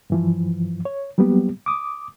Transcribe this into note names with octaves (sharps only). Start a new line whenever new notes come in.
G2 E3 F3
C#5
F#3 G3 A#3 B3 G4
D6 D#6